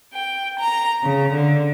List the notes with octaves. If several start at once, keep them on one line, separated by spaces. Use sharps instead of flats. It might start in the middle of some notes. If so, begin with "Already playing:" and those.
G5
A#5
C#3
D3